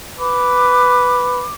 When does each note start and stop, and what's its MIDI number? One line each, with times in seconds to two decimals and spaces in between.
0.19 1.44 71
0.19 1.54 86